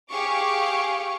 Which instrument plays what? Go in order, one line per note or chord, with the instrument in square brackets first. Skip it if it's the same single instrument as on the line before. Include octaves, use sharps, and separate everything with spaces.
[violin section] G4 G#4 F5 C#6 D6